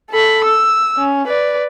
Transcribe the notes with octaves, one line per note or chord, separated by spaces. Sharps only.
A4 B5
E6
C#4
B4 D5